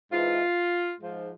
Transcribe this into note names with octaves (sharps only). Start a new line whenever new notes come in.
G#2 E3 F4
G#2 F3